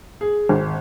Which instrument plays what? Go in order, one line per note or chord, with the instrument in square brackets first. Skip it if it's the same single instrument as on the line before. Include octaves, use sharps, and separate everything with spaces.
[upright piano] G#4
G#1